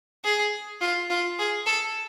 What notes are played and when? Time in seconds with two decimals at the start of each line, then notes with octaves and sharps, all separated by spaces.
0.24 G#4
0.81 F4
1.10 F4
1.39 G#4
1.66 A4